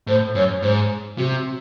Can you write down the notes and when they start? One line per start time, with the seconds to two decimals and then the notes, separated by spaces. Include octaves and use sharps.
0.07 A2 C5
0.35 F#2 C#5
0.62 G#2 C5
1.18 C3 F#4